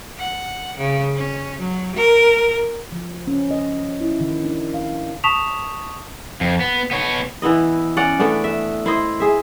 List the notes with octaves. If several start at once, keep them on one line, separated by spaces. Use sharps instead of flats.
F#5
C#3
C#4
F#3
A#4
F3
C#4
D#5
E4
D#3
D4
F5
A5 C#6 D#6 B6 E7 F7
F2
B3
B3 C#5
E3 B3 E4 D#5
C#4 D5 F#5
E3 A3 B3 D4
E5
E4 C5 D#5
G#4 E5